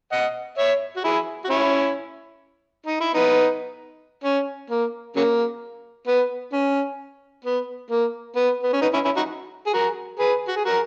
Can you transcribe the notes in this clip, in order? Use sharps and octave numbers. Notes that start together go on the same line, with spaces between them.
D#5 F#5
C#5 E5
F#4
E4 G#4
F#4
C#4 E4
D#4
E4
B3 D#4
C#4
A#3
C#3 F#3 A#3
B3
C#4
B3
A#3
B3
B3
C#4
B3 D#4
C#4 E4
C#4 E4
D#4 F#4
G#4
F#4 A#4
G#4 B4
F#4
G#4
F#4 A#4